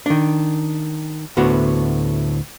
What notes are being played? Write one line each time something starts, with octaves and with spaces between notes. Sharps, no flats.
D#3 D4
D2 A2 B3 D4 F#4